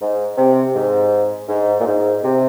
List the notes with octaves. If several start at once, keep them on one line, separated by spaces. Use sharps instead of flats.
G#2
C3
G#2
G#2
A#2
G#2
C3